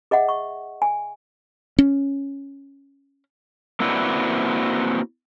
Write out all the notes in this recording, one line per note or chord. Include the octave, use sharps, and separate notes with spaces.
G#4 D#5 E5 F#5
C#6
G#5
C#4
A#3 C4 E4 F#4 B4 D5